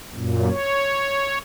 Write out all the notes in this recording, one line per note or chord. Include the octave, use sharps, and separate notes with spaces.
F#2 A#2
C#5